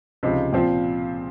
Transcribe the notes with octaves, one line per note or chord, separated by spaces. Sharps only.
C#2 C3 F3 C4 D#4
A#2 F3 C4 F4